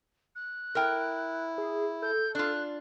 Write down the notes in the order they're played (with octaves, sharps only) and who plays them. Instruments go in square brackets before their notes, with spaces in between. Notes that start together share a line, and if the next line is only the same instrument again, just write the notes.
[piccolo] F#6
[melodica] E4 [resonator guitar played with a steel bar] A#4 G5
[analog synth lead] G#4
[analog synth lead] A4 [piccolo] G6
[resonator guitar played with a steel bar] D4 F4 [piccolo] F#6